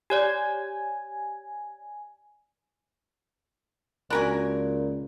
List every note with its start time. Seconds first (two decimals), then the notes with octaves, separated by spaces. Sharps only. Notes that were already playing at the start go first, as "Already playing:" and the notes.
0.10 G4 C#5 D5 G#5
4.10 C#2 A#2 D4 F#4 A#4 G#5 B5